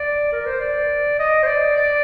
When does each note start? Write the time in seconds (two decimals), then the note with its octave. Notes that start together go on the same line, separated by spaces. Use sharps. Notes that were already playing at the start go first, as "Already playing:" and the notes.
Already playing: D5
0.32 A#4
0.46 C5
0.60 D5
1.19 D#5
1.43 C5
1.47 D5
1.77 D5